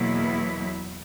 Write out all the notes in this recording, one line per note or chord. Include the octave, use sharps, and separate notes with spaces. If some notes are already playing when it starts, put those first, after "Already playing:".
Already playing: E2 B2 F#3 A#3 E4